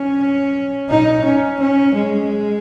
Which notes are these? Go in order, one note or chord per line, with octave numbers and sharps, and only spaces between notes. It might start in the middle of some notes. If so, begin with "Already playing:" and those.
Already playing: C#4
D#4
C#4
C#4
G#3